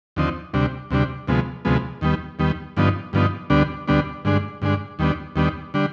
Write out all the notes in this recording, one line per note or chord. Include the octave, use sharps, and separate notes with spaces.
D#2 D3 F3 C4 D#4
D2 C3 G3 D4
D2 C3 G3 D4
D2 C3 F3 G#3 B3
D2 C3 F3 G#3 B3
D#2 D#3 G3 B3
D#2 D#3 G3 B3
G2 D3 F3 B3 D#4
G2 D3 F3 B3 D#4
D2 D3 G3 B3 D4
D2 D3 G3 B3 D4
G2 D3 G#3 D4
G2 D3 G#3 D4
D#2 D#3 G3 B3 D4
D#2 D#3 G3 B3 D4
D3 G3 D4